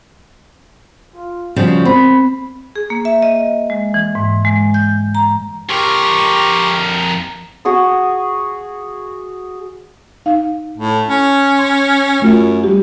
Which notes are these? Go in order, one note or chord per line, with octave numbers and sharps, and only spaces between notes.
F4
C#3 F3 G3 F#4
C4 B5
G#4
A#3
E5
D#5
G#3
E3
G#2
G#3
G6
A#5
F2 G4 A#4 C6 C#6
F#4 G#4 D#6
D#4 F5
A2
C#4
C6
F#2 A3 F4
G3 G4